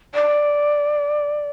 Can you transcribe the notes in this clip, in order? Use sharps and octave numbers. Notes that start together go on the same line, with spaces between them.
D5